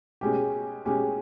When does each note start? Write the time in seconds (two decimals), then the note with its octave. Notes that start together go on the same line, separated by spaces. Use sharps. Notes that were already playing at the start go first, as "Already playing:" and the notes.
0.21 B2 G#3 C#4 G4
0.85 B2 G#3 C#4 G4